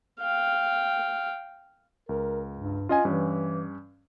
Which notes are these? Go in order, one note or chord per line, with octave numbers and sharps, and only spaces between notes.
F5 G5
C#2 A#4
G2
C#4 F4 D#5 G#5
G2 E3 C#4